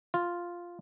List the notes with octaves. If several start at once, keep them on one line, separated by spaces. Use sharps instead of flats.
F4